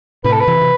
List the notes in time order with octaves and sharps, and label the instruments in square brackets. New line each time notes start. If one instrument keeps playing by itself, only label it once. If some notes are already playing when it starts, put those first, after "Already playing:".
[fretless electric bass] A2 C3 [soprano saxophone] B4
[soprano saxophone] A4
B4
[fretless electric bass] C3 E3
C3